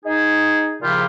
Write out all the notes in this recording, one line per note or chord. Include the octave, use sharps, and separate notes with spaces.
D#4 G#4
A#2 C#3 F3 E4 F4 G4